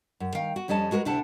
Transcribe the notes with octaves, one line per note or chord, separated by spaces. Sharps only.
F#2
D#3 F5 G5
F#4
F2 G3 C#4 D#5 A5
G#3 F#4 G#4 A#4 B4
D2 C3 D4 E4 F#5 A5